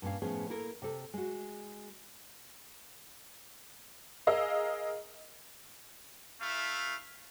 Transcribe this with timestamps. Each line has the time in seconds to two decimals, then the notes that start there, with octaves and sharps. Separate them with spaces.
0.02 G2 A#2 D#3 C#4 F5
0.22 A2 F3 B3 C#4 G#4
0.49 A#3 E4 A4 A#4
0.82 C3 A4
1.14 G#3 F#4
4.27 G#4 A#4 D#5 F5 E6
6.42 A3 E4 F5